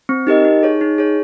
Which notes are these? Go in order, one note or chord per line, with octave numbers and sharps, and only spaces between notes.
C4
D#4 G4 A#4 D#5
D#4
G#4 C#5
D#4
G#4 C#5